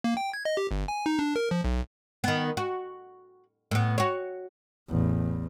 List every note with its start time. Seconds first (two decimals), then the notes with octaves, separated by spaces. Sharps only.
0.04 A#3
0.17 G5
0.34 G#6
0.45 D#5
0.57 G4
0.71 G1
0.88 G#5
1.06 D#4
1.19 D4
1.36 A#4
1.51 F3
1.64 B1
2.24 D#3 B3
2.57 F#4
3.71 A2 B3
3.98 F#4 C#5
4.89 A1 E2